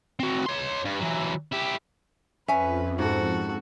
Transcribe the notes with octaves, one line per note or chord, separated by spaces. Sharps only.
C4 F#4
C#5 C6
G2
E3 F#3
E4 G4
F2 C#4 B4 E5 G#5
G#2 F#4 A4